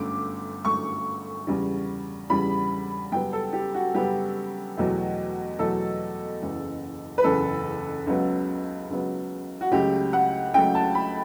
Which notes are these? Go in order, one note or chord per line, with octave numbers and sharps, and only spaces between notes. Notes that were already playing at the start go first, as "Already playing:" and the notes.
Already playing: G1 F#2 D3 A3 D6
G1 F#2 D3 A3 C#6
E2 C#3 G3
E2 C#3 G3 B5
F#2 C#3 G3 B3 G5
A4
G4
F#4
F#2 C#3 G3 B3 G4
E2 B2 F#3 A3
E2 B2 F#3 A3 A4
F#1 E2 C#3
B4
F#1 E2 C#3 A4
C#2 C#3 F#3 B3
C#2 C#3 F#3 B3
F#4
C#2 C#3 F#3 A3 G4
F#5
C#2 C#3 F#3 A3 G5
A5
B5